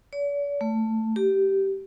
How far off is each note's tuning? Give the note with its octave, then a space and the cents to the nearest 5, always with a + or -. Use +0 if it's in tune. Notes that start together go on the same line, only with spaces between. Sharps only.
D5 -45
A3 +10
G4 -15